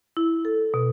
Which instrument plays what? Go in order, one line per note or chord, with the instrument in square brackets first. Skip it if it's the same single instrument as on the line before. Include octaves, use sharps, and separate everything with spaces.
[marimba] E4
A4
B2